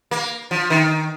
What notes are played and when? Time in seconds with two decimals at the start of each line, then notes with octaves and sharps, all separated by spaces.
0.11 A#3
0.51 F3
0.70 D#3